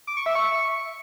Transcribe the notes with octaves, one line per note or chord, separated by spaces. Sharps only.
D6
C#6
E5
C#6